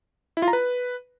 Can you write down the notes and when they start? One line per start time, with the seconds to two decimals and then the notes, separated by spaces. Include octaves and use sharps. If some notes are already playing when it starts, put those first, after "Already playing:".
0.37 E4
0.42 F4
0.48 A#5
0.53 B4